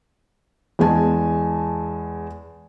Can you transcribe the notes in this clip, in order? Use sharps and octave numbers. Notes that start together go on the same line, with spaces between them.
E2 G#3 G#5 A5